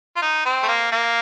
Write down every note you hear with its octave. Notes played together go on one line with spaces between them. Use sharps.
F4
D#4
C4
A3
A#3
A#3